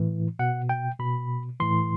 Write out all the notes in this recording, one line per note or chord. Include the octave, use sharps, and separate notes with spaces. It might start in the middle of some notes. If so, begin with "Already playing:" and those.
Already playing: A2 E3
B2 F#5
G5
B2 B5
A2 E3 C6